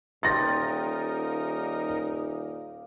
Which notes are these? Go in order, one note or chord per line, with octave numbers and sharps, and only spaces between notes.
D#1 D#4 F4 G4 A#4 A6 A#6